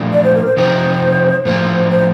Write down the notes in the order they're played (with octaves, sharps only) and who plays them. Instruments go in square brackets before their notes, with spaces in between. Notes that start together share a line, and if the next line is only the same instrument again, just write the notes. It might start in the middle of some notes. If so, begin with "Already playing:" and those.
Already playing: [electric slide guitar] A#2 F3 A3 D4
[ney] D5
C5
A#4
C5
[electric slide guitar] C3 F3 C4 D#4 [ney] C5
[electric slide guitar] A2 F3 A#3 [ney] C5
[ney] C5